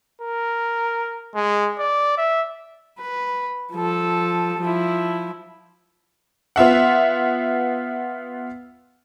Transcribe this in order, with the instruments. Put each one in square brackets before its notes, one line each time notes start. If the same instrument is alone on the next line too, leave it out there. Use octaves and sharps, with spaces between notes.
[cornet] A#4
G#3
D5
E5
[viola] B4
F3 A4
F3 E4
[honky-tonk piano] B3 F4 E5 F#5